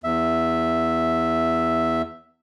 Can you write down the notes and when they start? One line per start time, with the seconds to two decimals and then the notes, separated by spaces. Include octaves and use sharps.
0.04 E2 E5